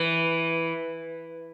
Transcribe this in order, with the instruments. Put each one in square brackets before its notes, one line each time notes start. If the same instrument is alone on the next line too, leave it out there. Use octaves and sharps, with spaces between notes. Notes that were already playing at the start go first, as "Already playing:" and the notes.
Already playing: [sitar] E3